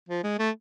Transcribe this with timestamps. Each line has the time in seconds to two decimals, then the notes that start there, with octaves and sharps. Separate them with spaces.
0.09 F3
0.24 G#3
0.39 A3